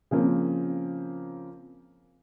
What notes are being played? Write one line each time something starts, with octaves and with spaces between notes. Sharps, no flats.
C#3 F3 A#3 C4